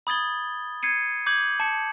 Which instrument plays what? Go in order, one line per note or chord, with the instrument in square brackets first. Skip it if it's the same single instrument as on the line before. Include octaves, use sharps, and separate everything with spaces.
[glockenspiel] B5 D#6 G#6 A6 G7
G#6 C7 C#7 D#7
D6 G6 G#6 F#7
A5 C#7